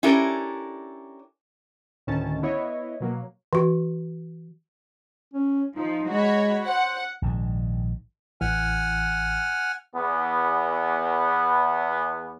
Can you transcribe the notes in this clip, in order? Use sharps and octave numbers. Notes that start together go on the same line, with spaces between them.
C#4 D4 E4 G4 A4 A#4
D2 A2 D#3 C#4 A5
B3 E4 C#5 D#5
B2 F#3 A#3
E3 F#4
C#4
F3 D#4
G#3 F#4 C#5 B5
C5 F#5
A#1 G#2 B2 D#3
A1 E3 F#5 G#5 F6
E2 B3